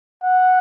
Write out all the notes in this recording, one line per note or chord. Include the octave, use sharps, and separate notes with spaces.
F#5